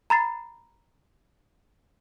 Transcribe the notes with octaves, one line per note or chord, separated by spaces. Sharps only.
A#5 B5 A6 C7